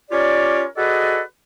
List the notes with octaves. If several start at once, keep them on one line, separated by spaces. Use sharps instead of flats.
C#4 F4 G4 A#4 C#5 D5
F#4 G#4 A4 B4 D5 D#5